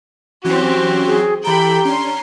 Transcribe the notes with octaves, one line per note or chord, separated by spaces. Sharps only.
E3 F#3 C4 C#4 F#4 G4
G#4
E3 G4 A4 G5 A#5 B5
C#4 D4 C6